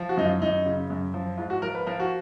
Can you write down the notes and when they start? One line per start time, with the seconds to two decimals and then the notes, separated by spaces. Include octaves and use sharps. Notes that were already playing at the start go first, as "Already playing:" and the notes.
Already playing: F3
0.09 F#4
0.17 F#2 D#4
0.25 F4
0.41 F#2 D#4
0.65 C#3
0.90 F#2
1.14 F3
1.38 G#2 F4
1.50 F#4
1.62 F3 A#4
1.75 B4
1.86 F3 A#4
2.00 F#4